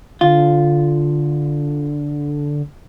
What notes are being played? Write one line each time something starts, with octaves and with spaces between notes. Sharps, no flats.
D3 F4